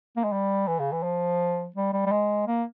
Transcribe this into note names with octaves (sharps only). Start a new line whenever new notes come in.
A#3
G#3
G3
E3
C#3
E3
F3
G3
G3
G3
G#3
A#3